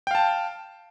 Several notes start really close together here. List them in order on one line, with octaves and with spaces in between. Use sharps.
G5 F5 A5